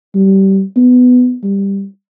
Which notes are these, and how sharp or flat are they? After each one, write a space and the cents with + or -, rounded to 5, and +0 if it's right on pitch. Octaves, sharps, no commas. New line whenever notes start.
G3 -20
B3 +15
G3 +10